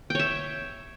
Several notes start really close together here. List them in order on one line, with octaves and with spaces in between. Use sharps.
G5 C#5 E5